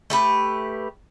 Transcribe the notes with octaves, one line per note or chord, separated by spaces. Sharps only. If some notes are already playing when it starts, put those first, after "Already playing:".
A3 G4 B4